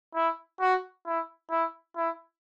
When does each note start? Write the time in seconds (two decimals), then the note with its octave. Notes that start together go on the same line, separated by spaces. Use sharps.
0.15 E4
0.61 F#4
1.06 E4
1.51 E4
1.96 E4